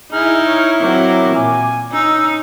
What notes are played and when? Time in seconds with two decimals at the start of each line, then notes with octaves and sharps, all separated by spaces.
0.12 D#4 E4 G#4 F6
0.46 C#5
0.81 F#3 C4 A#4 D6
1.35 A#2 G#5
1.92 C#4 D#4 E6